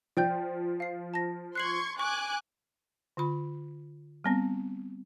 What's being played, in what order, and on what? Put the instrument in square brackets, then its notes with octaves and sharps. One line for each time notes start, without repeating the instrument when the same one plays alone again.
[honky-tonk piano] F3 [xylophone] D5 G5 G6
[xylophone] F5 C7
A5 A#6
[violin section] C6 C#6 G#6 [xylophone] F#6 C7 F#7
[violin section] G#5 D6 F#6 [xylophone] C#6
[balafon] D3 F4 B5
G3 B3 C4